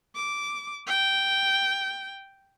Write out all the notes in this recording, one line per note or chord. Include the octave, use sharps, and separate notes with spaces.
D6
G5